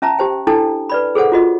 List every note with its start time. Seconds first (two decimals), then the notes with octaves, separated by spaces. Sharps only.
0.02 C#4 E5 A5 A#5
0.19 G4 C5 G5
0.47 D4 E4 A4 G5 A5
0.90 B4 D5 B5
1.15 G#4 A4 C5 F#5
1.32 F4 F#4 D#5